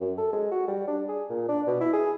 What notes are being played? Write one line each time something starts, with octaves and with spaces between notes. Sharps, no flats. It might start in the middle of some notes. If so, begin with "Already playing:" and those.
F#2
A4
G#3
F#4
G3
D4
G#4
A#2
D4
B2
E4
G#4